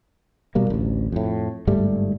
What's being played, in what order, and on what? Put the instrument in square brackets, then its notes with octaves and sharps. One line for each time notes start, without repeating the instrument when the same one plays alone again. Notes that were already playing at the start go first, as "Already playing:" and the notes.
[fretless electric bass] B2 G3 A#3
A1 D2
F2 A2
G1 G#2 G3 A3